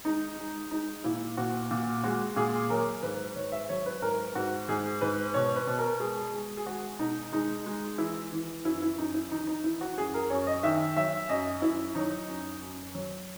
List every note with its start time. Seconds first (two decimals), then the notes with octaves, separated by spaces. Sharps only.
0.05 G#3 D#4
0.38 G#3
0.71 G#3 D#4
1.04 A#2 E4
1.37 A#2 F#4
1.71 A#2
2.03 G#3 F#4
2.36 A#2 G#4
2.70 F#3 A#4
3.03 G#2 B4
3.36 G#2 C#5
3.52 E5
3.69 F#3 C#5
3.86 B4
4.02 G#2 A#4
4.35 G#2 F#4
4.68 G#2 G#4
5.01 G#2 B4
5.34 B2 C#5
5.56 B4
5.67 B2
5.79 A#4
6.00 G#3 G#4
6.33 G#3
6.57 G#4
6.66 G#3 F#4
6.99 B2 D#4
7.32 G#3 D#4
7.66 G#3
7.98 E3 E4
8.32 E3
8.65 F#2 E4
8.82 E4
8.98 F#2 D#4
9.14 E4
9.31 E3 D#4
9.47 D#4
9.64 E3 E4
9.81 F#4
9.97 F#2 G#4
10.14 A#4
10.30 F#2 C#5
10.47 D#5
10.63 D#3 E5
10.96 F#3 E5
11.29 F#2 D#5
11.62 F#2 E4
11.95 F#3 D#4
12.28 F#2
12.62 F#2
12.95 F#3